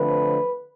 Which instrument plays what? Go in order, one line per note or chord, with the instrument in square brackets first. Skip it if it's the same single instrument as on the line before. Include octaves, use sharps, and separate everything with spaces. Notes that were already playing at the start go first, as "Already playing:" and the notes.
Already playing: [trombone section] D3 F3 A3 C4 B4